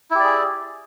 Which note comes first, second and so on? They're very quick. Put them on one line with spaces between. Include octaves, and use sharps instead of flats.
E4 G4 D5 G#4